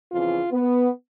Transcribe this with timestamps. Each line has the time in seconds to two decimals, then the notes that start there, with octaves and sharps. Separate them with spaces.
0.11 F2 C#3 E3 F4
0.51 B3